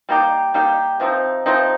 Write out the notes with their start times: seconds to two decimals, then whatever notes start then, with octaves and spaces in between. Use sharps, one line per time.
0.09 G3 A#3 D#4 G4
0.54 G3 A#3 D#4 G4
1.00 C3 F3 C4 D#4
1.46 C3 F3 C4 D#4